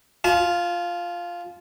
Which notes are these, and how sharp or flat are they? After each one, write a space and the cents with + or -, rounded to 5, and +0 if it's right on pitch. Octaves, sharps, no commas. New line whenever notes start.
F4 +0 A5 -40